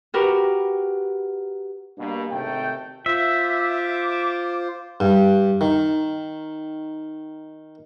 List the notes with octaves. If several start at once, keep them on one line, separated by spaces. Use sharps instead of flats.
F#4 G4 A#4 B4
G2 B2 A#3
G#1 C3 D#3 A3 G5
F4 C5 E5
D6
G2
D#3